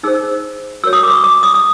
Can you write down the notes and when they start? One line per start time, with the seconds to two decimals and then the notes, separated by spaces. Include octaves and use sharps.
0.03 D#4 G#4 C5 E6
0.84 F#4 A#4 C#5 E6
0.93 D#6
1.03 D6
1.13 C#6
1.24 D6
1.43 D#6
1.54 D#6